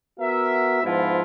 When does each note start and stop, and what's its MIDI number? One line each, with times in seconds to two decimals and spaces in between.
0.20 0.81 59
0.20 0.81 66
0.20 0.81 70
0.20 0.81 76
0.84 1.23 44
0.84 1.23 53
0.84 1.23 59
0.84 1.23 64
0.84 1.23 65